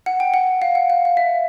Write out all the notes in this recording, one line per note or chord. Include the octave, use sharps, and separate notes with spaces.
F#5
G5
F#5
F5
F#5
F5
F5
E5